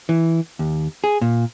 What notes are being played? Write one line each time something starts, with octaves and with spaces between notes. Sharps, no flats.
E3
D#2
G#4
A#2